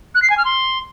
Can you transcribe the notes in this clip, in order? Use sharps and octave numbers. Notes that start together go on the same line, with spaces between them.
F#6
C7
G#5
F6
C6